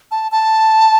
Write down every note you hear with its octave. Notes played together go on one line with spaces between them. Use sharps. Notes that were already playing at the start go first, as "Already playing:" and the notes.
A5
A5